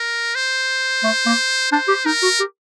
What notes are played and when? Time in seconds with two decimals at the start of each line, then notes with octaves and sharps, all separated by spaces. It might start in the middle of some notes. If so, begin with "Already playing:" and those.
Already playing: A#4
0.35 C5
1.03 A3
1.26 A#3
1.72 D4 C5
1.88 G4
2.06 D#4 A#4
2.23 F#4
2.40 G4